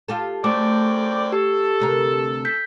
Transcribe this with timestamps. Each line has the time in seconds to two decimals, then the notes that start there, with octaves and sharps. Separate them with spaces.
0.08 F4 G4 A4
0.44 F#2 A3 C4 D5 D6
1.32 G4 A4
1.80 D2 C3 A#4
2.45 G6 B6